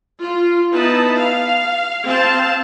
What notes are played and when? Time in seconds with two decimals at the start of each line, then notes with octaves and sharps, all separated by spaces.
0.22 F4
0.73 B3 D#4 E4 B4 A5
1.20 F5
2.05 C4 F5 A5